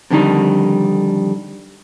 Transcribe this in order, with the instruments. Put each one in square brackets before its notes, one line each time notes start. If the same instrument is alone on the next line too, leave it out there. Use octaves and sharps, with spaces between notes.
[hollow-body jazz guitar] F2 D3 D#3 G3 D#4